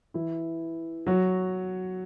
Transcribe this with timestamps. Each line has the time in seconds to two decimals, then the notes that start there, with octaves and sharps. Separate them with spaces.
0.14 E3 E4
1.07 F#3 F#4